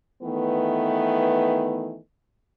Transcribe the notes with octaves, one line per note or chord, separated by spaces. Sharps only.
D#3 E3 A3 B3